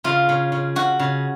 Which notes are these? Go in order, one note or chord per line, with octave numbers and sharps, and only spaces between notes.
C#3 F4
C#3
C#3
C#3 F#4
C#3